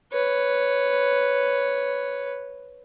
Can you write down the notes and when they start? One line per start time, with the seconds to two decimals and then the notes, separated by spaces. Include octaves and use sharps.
0.12 B4 C#5